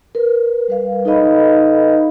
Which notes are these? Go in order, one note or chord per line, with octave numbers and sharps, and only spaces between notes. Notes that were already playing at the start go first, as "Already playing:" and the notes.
A#4 B4
G3 B4 F5
D#4 A4 B4 D#5 F5 B5